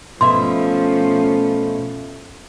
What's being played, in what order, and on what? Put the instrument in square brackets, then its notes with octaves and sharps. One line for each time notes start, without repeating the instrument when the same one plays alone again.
[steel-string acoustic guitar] B2 E5 [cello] F3 C#4 [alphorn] A3 [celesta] C6